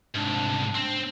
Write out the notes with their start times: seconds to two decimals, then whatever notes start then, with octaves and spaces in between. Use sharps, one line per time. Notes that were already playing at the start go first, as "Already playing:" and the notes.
0.15 C2 G#2 D4
0.75 C4